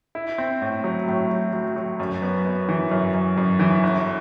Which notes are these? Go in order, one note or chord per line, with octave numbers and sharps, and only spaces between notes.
E4
C4
A2
F#3
A2
F#3
F#3
F#3
F#2
B3
B3
E3
F#2
F#2
F#2
E3
G1